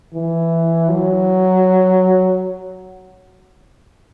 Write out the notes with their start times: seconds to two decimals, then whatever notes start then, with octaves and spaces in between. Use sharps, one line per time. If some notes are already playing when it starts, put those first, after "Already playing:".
0.14 E3
0.89 F#3